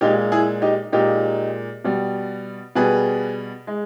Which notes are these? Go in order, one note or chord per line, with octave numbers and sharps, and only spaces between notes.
A#2 G#3 D#4 G4
E4 G#4
D#4 G4
A#2 G#3 D#4 G4
B2 G3
B2 G3 G#4 B4
G#3